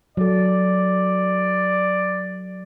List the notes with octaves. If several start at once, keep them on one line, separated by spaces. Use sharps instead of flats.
F#3 A4 D5